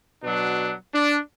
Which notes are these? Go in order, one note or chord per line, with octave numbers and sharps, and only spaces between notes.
B2 F#3 D4
D4